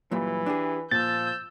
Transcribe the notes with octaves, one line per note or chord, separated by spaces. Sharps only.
F#2 A#2 E3 G3
D4 G4 G#4
A#2 F3 E6 G6 A6